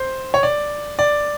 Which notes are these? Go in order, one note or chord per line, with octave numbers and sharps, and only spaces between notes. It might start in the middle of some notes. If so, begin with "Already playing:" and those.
Already playing: C5
C#5
D5
D5